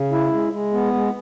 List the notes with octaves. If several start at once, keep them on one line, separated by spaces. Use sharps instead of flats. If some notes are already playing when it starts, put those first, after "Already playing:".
Already playing: C#3
E4
G#3
G#3
B3
G#3